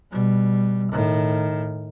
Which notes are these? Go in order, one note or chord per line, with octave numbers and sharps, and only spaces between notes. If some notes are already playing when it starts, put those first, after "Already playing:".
B2 G3
A2 D#3